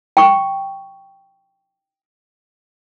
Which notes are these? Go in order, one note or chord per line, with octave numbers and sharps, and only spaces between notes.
G5 C#6